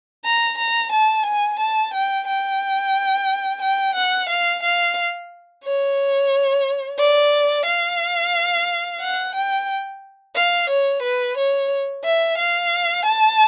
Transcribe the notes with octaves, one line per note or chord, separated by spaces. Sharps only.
A#5
A#5
A5
G#5
A5
G5
G5
G5
F#5
F5
F5
C#5
D5
F5
F#5
G5
F5
C#5
B4
C#5
E5
F5
A5